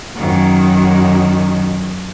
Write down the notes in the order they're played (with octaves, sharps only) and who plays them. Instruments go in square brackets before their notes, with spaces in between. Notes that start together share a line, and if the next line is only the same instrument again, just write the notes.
[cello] F#2 D#3